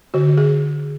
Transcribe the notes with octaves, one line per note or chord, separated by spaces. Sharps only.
D3 F#4
D3
G#4